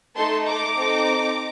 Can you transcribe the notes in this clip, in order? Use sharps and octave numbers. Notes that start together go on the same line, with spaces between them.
A3 D#4 A4 A5 C6
A#5 D6
C4 D#4 A4